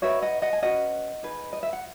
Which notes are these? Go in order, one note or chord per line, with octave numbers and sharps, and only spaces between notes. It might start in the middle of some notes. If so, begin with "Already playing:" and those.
D#4 F#4 B4 C#5 E5
D#5 F#5
D#5 F#5
G#5
C#4 F#4 B4 D#5 F#5
D#4 G#4 B4
D#5
E5
F#5